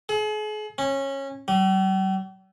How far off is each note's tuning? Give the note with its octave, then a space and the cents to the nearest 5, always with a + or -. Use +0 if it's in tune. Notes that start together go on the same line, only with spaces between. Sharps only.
G#4 +40
C#4 -20
G3 -45